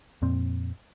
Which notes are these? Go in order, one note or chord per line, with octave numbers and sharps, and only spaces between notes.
F2 A#2 C4